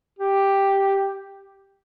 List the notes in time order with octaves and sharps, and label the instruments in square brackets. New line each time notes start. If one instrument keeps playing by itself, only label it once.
[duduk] G4